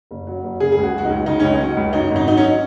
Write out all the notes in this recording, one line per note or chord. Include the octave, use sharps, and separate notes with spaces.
F#1
F#3
F#1
C#3 G#4
C#2 G#4
F#4
F#3
F#4
D#4
C#2
C#3 D#4
C#2 C#4
D#4
F#3
C#2
F#2 D#4
G#1
D#4
F#3 D#4
C#4